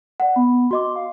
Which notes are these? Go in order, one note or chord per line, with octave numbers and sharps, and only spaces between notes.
D5 F#5
B3 B5
F#4 D#5 C6 D6
F5